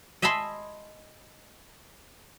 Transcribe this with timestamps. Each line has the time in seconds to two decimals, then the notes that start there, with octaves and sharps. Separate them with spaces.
0.22 D#5 E5 G#5 A5 B5 C6